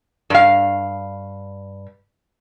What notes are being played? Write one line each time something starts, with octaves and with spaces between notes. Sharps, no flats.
G2 F5